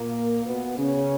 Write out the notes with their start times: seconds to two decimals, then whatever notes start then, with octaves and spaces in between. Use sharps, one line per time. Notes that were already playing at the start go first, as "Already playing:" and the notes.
Already playing: A#2 A#3
0.45 B2 B3
0.78 C#3 C#4